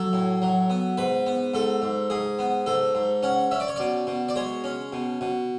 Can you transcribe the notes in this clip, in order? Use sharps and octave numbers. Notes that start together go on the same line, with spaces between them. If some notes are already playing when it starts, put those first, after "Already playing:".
Already playing: F#3 A4
A2
F#3
B3
G#2 B4
B3
G#2 A4
G#2
G#2 G#4
B3
G#2 A4
G#2
C#4 F#5
C#4 E5
D5
C#5
B2 D5
B2
D5
G#3 C#5
C#4
B2
B2